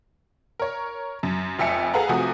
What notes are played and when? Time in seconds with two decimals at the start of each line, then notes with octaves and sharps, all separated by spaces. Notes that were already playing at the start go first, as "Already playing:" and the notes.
0.59 A#4 C#5
1.23 F#2
1.59 F1 F2 E5 G#5 C#7
1.94 G#4 A4 B4 F5 F#5 A#5
2.09 C3 F3 A3 F#4 G#5 D#6